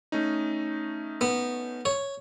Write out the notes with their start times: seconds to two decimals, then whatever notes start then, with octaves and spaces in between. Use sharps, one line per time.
0.12 A3 C#4 D#4
1.21 B3
1.85 C#5